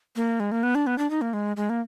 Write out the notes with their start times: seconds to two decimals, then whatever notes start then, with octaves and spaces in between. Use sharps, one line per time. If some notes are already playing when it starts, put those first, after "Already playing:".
0.16 A#3
0.40 G#3
0.52 A#3
0.63 B3
0.75 D4
0.87 B3
0.98 D4
1.10 D#4
1.21 A#3
1.33 G#3
1.57 G#3
1.69 A#3